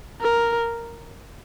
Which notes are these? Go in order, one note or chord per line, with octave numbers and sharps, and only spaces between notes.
A#4